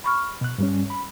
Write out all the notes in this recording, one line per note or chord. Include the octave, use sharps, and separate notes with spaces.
B5 C#6 F6
B2 F#6
G2 G3 C#4
B5